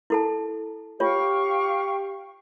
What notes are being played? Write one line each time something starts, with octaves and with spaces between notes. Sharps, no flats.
E4 A4 A5
F4 G4 C#5 F5 G5 C#6